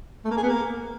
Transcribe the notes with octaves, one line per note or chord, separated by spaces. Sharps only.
A3
A#3
G#4
B3
A#3